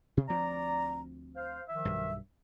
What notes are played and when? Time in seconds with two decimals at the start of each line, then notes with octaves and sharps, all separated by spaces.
0.17 C3
0.29 D2 F3 C4 D5 A#5
1.36 C5 F5
1.69 D#3 F3 E5
1.85 B1 G2